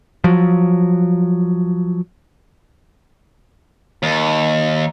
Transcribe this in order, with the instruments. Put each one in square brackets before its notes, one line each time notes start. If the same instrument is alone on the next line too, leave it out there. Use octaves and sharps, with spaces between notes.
[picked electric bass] F3 F#3
[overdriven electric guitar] D#2